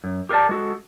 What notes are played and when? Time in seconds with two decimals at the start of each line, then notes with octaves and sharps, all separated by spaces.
0.04 F#2
0.29 G4 A#4 B4 D5 A5
0.49 G#3 F#4 A4